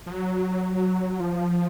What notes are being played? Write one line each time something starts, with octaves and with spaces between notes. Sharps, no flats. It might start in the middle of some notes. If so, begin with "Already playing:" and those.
F3
F#3
F3